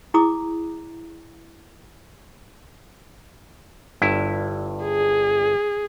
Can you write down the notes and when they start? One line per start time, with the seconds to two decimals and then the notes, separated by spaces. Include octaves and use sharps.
0.14 E4 G#4 A#5 D6 D#6
4.02 G1 G2 E4
4.85 G#4